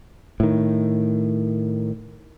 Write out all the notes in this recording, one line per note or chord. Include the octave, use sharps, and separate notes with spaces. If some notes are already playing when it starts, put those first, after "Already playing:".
A2 D#3